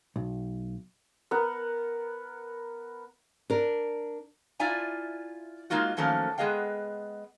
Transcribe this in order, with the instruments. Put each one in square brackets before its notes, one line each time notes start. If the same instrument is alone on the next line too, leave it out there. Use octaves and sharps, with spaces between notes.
[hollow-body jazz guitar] B1
[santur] B3 A#4 F#5
[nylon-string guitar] D4 A#4
[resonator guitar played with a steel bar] E4 F4 D5 E5 G#5 A#5
G#3 A#3 D#4 F4 F#4
D#3 F3 F#3 A3 A#3 C#4
G#3 B3 G#4 D#5 F5 G5